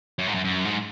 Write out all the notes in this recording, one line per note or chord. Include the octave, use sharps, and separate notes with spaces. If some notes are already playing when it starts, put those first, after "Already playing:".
F#2
G#2
F#2
F#2
G#2